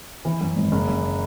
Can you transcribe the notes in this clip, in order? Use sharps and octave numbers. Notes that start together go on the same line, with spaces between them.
E3
F#2
G#1
F#1
F#2